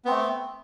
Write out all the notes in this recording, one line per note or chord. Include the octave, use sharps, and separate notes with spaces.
A3 B3 C4